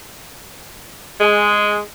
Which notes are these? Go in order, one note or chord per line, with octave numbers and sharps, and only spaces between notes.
G#3